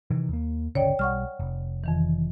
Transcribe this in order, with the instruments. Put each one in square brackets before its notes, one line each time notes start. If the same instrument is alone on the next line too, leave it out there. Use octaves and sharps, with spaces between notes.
[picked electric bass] C3 D#3 E3
D#2 A#3
[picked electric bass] D1 G1 C#3 [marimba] C#5 D5 G5
[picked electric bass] B1 G3 [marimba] F#5 C#6 F6
[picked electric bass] F1
[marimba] F2 D#3 E3